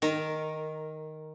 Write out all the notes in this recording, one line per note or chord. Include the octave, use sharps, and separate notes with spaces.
D#3 A#4